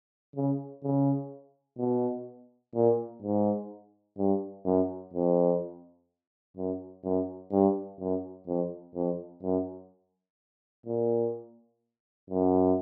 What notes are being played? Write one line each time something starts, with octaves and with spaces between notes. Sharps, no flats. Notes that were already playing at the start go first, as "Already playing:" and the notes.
C#3
C#3
B2
A#2
G#2
G2
F#2
F2
F#2
F#2
G2
F#2
F2
F2
F#2
A#2
F#2